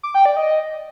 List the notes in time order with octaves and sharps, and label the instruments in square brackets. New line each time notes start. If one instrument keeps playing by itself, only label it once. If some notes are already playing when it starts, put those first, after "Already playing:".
[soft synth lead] D6
G5
D5
D#5